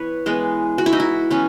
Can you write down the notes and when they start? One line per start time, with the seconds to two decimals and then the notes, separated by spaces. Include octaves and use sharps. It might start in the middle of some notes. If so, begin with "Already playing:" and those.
Already playing: E3 B3 B4 C#5
0.26 E3 G#3 B3
0.78 F#4
0.86 E4
0.93 D#4
1.00 E4
1.31 E3 B3 C#4